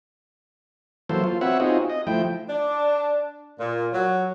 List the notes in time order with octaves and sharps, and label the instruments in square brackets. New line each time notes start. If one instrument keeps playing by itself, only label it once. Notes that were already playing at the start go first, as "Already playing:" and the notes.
[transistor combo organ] E3 F#3 A#3 A4 C5
F4
C4 F#4 B4 C#5 E5 F#5
C4 D#4 F4 F#4 G#4
D#5
F3 A3 E4 G5
[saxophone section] D4
A#2
F#3